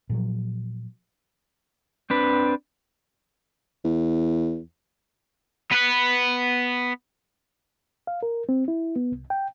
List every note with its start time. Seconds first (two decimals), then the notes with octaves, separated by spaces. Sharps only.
0.10 A#2 F3 F#3
2.10 C4 D4 B4
3.85 E2
5.72 B3 B4
8.07 F5
8.23 A#4
8.49 C4
8.68 E4
8.96 B3
9.12 C2
9.30 G5